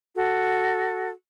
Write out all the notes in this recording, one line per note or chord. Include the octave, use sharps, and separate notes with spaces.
F#4 A4